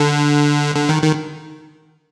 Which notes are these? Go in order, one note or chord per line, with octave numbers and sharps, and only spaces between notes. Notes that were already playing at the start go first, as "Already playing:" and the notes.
Already playing: D3
D3
D#3
D#3